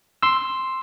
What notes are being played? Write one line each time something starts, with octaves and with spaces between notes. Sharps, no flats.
C6 E6